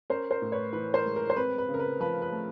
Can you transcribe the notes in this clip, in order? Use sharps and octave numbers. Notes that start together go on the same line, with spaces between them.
C#4 A#4 C5
A#4 C5
A2
B4 C#5
E3 B4
A#4 C5
G#3
A#4
C5
C4 B4
B4
C#3
A#4
B4
F3 B4
B4
A3